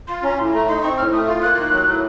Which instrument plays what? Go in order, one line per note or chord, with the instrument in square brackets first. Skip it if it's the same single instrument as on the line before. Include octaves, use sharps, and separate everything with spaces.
[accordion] F4 [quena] C6
[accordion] C#4 [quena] A#5
[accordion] A2 [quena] C6
[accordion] A3 [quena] A#5
[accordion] D#4 [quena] C6
[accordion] C4 [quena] C#6
[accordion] A2 [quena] F6
[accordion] A3 [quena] D#6
[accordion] F4
[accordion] A#3 [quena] F#6
[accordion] D#3
F#3
A2